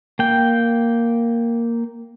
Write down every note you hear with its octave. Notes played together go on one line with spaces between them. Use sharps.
A#3 G5